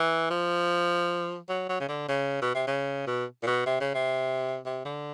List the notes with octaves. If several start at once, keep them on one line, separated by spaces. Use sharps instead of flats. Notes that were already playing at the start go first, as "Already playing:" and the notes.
Already playing: E3
F3
F#3
F#3
C#3
D3
C#3
B2
C3
C#3
B2
A#2
B2
C3
C#3
C3
C3
D3